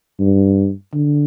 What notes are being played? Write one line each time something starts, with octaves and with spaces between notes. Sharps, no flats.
G2
D3